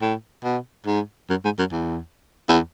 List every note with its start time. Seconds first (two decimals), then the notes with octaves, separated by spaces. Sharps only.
0.01 A2
0.44 B2
0.86 G#2
1.30 F#2
1.44 G#2
1.59 F#2
1.72 E2
2.48 E2